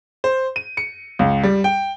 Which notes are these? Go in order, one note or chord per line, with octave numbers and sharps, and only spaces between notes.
C5
D#7
C#7
C#2
G3
G5